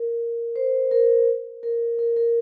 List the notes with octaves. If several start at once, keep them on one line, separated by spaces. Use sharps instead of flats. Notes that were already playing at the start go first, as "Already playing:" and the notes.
Already playing: A#4
C5
A#4
A#4
A#4
A#4